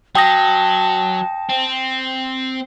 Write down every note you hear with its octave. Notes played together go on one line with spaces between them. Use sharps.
F#3 G5 A5 D#6 A#6
C4